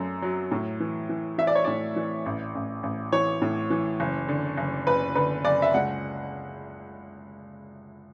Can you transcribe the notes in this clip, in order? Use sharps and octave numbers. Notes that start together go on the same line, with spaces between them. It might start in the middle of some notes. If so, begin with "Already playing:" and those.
Already playing: F#2 A3
F#3
A2
E3
E3
E3 E5
D5
C#5
A2 D5
E3
A1
A1
A1
E3 C#5
A2
E3
F#1
D3
F#1
F#1 B4
D3 B4
F#1 D5
E5
C#2 F#5